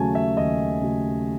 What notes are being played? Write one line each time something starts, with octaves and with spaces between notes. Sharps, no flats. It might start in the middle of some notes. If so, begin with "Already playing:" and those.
Already playing: D#2 C#3 F#3 A3 G#5 A5
E5
D#2 D#5
C#3 F#3 A3